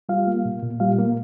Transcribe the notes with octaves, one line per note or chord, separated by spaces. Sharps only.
G3 F4 F5
A#3
A#2
A#2
G3 F4 F5
A#3